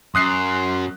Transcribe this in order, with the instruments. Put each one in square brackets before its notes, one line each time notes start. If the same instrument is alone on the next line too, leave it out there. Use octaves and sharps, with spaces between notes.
[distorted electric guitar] F#2 [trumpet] C6 [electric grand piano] D#6 F#6 C7